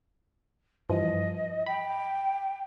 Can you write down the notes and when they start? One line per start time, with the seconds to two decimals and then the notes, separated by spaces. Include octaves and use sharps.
0.89 G2 E3 F3 D#5
1.66 G5 B5